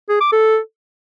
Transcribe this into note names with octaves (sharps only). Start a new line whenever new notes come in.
G#4
D6
A4